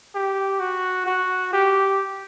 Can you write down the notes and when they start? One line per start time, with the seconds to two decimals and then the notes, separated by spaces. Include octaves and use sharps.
0.15 G4
0.60 F#4
1.07 F#4
1.53 G4